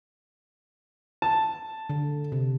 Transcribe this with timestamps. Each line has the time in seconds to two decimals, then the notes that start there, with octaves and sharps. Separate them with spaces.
1.22 A5
1.90 D3
2.32 C3